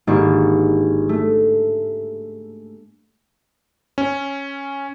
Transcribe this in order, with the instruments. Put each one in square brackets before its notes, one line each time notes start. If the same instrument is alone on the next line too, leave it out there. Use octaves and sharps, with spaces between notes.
[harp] G#1 A#3 D4 G4 C#6
A3
[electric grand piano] C#4